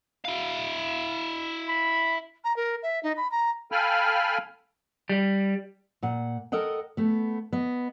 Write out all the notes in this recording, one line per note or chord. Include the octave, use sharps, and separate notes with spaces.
E4 F5
B5
A#5
A#4
E5
D#4
B5
A#5
A4 F5 G5 G#5 B5 F6
G3
A#2 F#5
A4 A#4 D#5 F#5 G5
A3 B3
B3 D#5